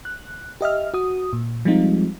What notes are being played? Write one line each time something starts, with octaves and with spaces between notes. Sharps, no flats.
F#6
G4 D#5 E5 F6
F#4 D#6
A#2
F3 G3 G#3 C4 D#4 F4